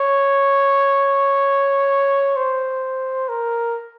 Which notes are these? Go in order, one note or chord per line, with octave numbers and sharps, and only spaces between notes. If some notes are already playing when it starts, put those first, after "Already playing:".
Already playing: C#5
C5
A#4